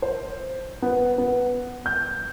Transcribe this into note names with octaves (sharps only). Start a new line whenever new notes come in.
C5
B3
B3
G6